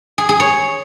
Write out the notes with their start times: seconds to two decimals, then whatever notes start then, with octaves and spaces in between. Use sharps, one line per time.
0.18 G#4
0.29 G#4
0.40 C#5